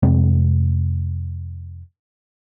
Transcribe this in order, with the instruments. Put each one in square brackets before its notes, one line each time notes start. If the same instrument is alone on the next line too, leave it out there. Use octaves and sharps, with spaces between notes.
[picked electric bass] F2 C3 G#3 C4